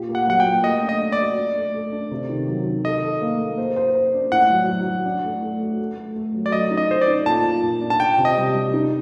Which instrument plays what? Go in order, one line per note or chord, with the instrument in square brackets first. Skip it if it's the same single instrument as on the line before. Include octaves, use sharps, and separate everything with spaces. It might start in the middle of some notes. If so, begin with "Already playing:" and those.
Already playing: [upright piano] A#2 G4
A#3
[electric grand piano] F#5
[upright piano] F#3 [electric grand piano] F#5
[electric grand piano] G5
[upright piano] A#3
[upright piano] A3 [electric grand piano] D#5
[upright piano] D4
[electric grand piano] D#5
[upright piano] D4
[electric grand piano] D5
[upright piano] F#4
D4
A3
A4
D4
C3
D#3
F#3
D#3
[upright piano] A4 [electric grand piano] D#5
[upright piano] A4
A#3
A#3
C5
C5
C5
D4
[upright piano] A2 [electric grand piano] F#5
[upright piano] F#3
F#3
F#3
D4
A3
A3
F#4
A3
A3
A3
F#3
[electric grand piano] D5
[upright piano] F#3 [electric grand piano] D#5
[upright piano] D#4
[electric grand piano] D#5
[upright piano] A4 [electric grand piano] C5
[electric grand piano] D5
[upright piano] D#4
[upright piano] A#2 [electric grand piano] A5
[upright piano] A#2
A#2
D4
[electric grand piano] A5
[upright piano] D4 [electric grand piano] G5
[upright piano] C3
[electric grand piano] D#5
[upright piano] G3
G3
D#4